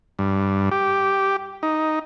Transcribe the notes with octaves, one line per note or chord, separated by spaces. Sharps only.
G2
G4
D#4